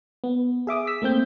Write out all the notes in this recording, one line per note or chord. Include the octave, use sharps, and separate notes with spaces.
B3
G#4 E5 D6 D#6
E6 B6
A3 A#3 C4 G6